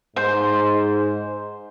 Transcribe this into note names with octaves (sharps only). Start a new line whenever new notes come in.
G#2 C5